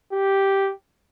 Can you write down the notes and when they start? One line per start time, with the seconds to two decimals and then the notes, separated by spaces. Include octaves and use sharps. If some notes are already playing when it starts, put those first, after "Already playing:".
0.12 G4